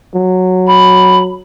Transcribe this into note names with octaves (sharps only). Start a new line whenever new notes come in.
F#3
B5